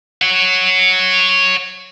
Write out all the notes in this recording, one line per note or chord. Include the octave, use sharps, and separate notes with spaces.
C#5 F#5